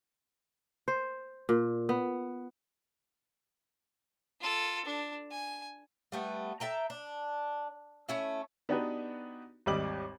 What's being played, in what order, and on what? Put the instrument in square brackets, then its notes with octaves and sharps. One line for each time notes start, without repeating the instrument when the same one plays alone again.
[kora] C5
A#2
B3
[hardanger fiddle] F4 A4
D4
G#5
[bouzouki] G3 A3 B3
A4 E5 G5 A#5
D4
A3 C#4 E4
[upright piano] B3 D4 D#4 F#4 G4 B4
G#1 D#2 G3 D#5 D6 F#7